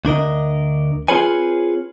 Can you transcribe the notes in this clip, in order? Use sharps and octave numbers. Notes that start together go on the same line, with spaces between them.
D2 D4 A#4 D#5
C4 F4 G#4 B4 C#5 G#5